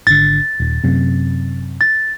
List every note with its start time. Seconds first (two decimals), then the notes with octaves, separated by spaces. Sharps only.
0.07 G#1 D3 A6
0.60 D#1
0.84 F#2 C3
1.81 A6